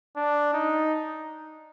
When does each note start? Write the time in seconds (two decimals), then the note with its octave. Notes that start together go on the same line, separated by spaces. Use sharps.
0.17 D4
0.54 D#4